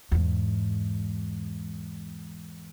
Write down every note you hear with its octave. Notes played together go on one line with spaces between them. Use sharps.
E2 G#2